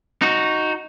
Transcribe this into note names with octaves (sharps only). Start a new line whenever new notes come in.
D#4 F#4